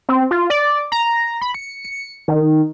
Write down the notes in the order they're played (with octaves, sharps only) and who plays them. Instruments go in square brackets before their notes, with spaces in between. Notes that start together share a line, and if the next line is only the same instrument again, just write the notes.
[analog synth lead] C4
F4
D5
A#5
B5
C#7
C#7
D#3